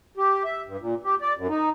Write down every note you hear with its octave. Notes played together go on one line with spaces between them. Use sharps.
G4
E5
G2
A#2
G4
D5
F#2
D#4